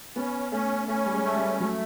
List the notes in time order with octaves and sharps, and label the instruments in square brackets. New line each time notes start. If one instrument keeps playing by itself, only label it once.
[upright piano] B3 [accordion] C#4
[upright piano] A3 [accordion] C#4
[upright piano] A3 [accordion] C#4
[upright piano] G3
G#3
[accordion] A3
[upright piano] G3
[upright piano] F#3 [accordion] A3